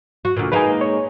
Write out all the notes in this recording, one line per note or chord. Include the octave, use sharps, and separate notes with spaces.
F#4
D2 A#2
G#3 A#3 D#4 B4 G#5
C#5